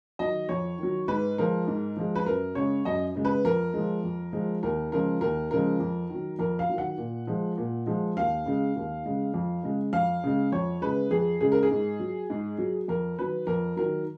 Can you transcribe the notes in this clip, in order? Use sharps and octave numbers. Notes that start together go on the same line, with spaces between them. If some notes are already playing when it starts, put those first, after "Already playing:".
D#3 F#3 D#5
F2 C#5
D#3 F#3
G#2 B4
F3 G#3 A#4
G#2
F3 G#3
B4
F#2 A#4
C#3 G#3 C#5
F#2 D#5
C#3 G#3
B4
F2 A#4
F3 G#3
F2
F3 G#3
D#2 A#4
C#3 F3 G#3 A#4
D#2 A#4
C#3 F3 G#3 A#4
F2
D#3 F#3
F2 A#4
F5
D#3 F#3
F#5
A#2
F3 G#3
A#2
F3 G#3
D#2 F5
C#3 G#3
D#2
C#3 G#3
F2
C#3 G#3
F2 F5
C#3 G#3
F2 C#5
C#3 G#3 B4
F2 G#4
C#3 G#3 G#4
A#4
G#4
G#2
F#3
G#2
F#3
F2 A#4
D#3 F#3 B4
F2 A#4
D#3 F#3 A#4